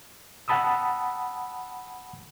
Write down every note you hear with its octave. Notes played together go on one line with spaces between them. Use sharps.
F#5 G5 A5 B5 D#6 E6